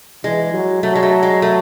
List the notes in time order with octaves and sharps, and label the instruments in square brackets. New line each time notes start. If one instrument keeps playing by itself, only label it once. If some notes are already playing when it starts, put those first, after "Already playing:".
[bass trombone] E3 [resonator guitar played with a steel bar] G#3
[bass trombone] F#3
[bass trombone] F#3 [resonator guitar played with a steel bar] A3
[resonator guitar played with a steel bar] G#3
A3
G#3
A3